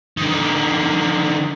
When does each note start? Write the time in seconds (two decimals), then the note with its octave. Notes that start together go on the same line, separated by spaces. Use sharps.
0.18 D3 D#3